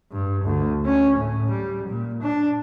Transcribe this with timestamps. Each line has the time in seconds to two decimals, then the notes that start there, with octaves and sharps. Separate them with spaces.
0.12 G2
0.44 D2
0.85 C#4
1.17 A2
1.50 G3
1.88 A#2
2.22 D4